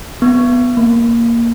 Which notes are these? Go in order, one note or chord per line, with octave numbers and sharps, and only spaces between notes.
B3
A#3